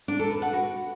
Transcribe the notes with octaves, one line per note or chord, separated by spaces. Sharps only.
D4
A4
B4
F#5
F#4